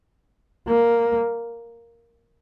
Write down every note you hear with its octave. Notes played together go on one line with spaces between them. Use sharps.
A#3